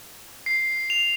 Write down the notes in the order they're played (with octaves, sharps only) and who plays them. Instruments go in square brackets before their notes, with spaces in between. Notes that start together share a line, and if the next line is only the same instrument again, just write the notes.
[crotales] C7
F7